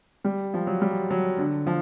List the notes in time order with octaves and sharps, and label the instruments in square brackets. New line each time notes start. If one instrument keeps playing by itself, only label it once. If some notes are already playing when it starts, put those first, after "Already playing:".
[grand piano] G3
F3
F#3
G3
F#3
D3
F3